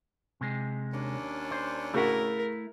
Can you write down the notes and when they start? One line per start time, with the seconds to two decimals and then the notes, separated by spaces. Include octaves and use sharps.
0.41 C3 G#3
0.93 D#2 C#4 D4
1.51 C5
1.94 C#3 A3 E4 F#4 A#4 F#5